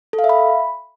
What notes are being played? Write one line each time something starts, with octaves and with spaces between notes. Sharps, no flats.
A4
F5
E5
B5